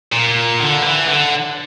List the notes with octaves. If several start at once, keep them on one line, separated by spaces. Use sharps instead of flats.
A#2
D3
E3
D3